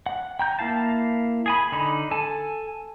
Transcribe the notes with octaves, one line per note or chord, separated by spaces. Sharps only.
F#5
G5 A#5 G6
A#3 E4 F5 A5
G#4 G#5 B5
D3 D#4 B5
A4 G#5 A5